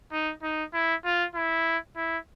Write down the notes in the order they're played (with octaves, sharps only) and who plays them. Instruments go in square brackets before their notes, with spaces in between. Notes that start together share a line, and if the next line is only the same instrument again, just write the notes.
[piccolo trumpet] D#4
D#4
E4
F4
E4
E4